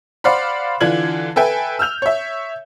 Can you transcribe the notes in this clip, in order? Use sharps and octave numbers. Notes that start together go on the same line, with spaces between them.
C5 D5 F5 F#5 B5
D3 E3 D4 F4 G#6 F#7
A4 B4 E5 G5 G#5
E6 F6 G6 F7
C#5 E5